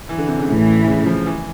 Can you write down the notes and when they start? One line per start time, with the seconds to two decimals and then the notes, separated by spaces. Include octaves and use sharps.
0.09 E3
0.18 D3
0.28 C3
0.38 C#3
0.48 A1 A2 E3
0.87 C#3
1.06 F3
1.26 E3